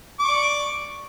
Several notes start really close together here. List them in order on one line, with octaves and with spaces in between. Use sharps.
D6 C#6 D5